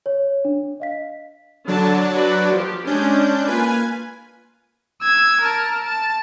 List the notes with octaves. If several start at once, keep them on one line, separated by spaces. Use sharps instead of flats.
C#5
D4
D#5 F5 B6
D3 F#3 D4 A5
F#4 B4 D5
F3 G4
G#3 C#4 D4 G6
A#3 F4 B4 G#5
E6 G#6
A#4 A5
A5